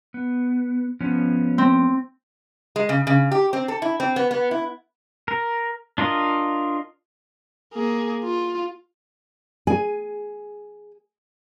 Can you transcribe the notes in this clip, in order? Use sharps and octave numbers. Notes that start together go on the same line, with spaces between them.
B3
F3 B3 C#4
C4
G#3
C#3
C#3
G4
C4
A4
E4
C4
B3
B3
E4
A#4
D4 F4 A#4 D#5
A#3 G#4
F4
G#4 G#5